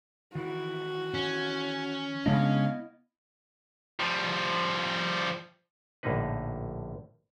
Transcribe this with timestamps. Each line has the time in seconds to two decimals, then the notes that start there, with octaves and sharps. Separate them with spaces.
0.35 D#3 E3 E4 F#4
1.14 C#4
2.26 C#3 G#3 B3 D4 E4 D#5 F5
4.00 F3 G3
6.03 A#1 A2 D3 A#3 D#4 B4